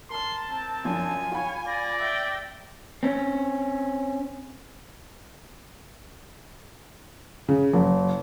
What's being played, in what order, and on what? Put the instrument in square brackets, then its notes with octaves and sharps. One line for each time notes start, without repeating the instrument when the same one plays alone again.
[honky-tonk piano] A#4 F6 [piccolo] A5 [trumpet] C6
[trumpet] C4
[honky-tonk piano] F#2 F3 D4 [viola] G#5
[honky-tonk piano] F4 G5 B5 [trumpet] C#5
[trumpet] D5 [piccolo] A#6
[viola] E5 G5
[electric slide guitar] C4 C#4
[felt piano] C#3
F#1